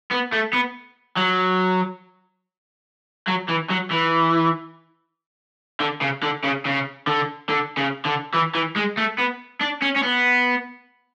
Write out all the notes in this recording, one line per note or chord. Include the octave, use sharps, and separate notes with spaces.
B3
A3
B3
F#3
F#3
E3
F#3
E3
D3
C#3
D3
C#3
C#3
D3
D3
C#3
D3
E3
E3
G#3
A3
B3
D4
C#4
C#4
B3